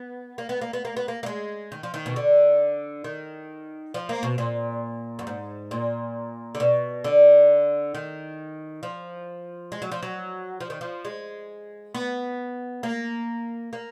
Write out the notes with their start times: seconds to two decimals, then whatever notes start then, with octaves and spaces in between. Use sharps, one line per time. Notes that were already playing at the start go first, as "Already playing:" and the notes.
Already playing: B3
0.38 A#3
0.49 B3
0.61 A#3
0.73 B3
0.85 A#3
0.97 B3
1.08 A#3
1.23 A#3
1.26 G#3
1.72 D#3
1.83 F3
1.94 D#3
2.06 B2
2.16 D3
3.04 D#3
3.94 F3
4.09 A#3
4.23 B2
4.38 A#2
5.19 F#2
5.27 G#2
5.71 A#2
6.55 D3
6.60 B2
7.04 D3
7.95 D#3
8.83 F3
9.72 G#3
9.82 F#3
9.92 F3
10.03 F#3
10.61 F3
10.70 D#3
10.81 F3
11.05 G#3
11.94 B3
12.83 A#3
13.73 A#3